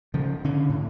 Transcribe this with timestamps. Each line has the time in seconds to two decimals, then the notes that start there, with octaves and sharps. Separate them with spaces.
0.14 C#3 F3
0.44 D3 C#4
0.69 A2